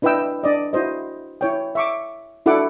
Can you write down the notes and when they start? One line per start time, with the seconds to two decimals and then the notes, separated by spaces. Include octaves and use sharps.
0.02 D4 E4 B4 D#5 G5 E6
0.43 D4 D5 D#5
0.73 E4 F#4 C5 D#5
1.41 E4 C#5 G5
1.75 E5 C#6 D6
2.46 D4 E4 F#4 A4 F#5 D6